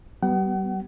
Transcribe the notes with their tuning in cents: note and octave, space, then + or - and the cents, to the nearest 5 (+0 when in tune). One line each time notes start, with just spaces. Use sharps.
G3 -35 B3 +0 F#5 +40